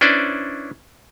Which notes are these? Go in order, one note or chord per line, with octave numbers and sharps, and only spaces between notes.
C#4 D4 E4 B4 C5 D5